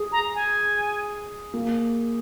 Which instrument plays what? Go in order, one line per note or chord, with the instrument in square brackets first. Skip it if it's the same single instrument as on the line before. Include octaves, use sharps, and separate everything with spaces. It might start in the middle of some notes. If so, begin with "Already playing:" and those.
Already playing: [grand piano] G#4
[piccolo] A#5
G#5
[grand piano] A#3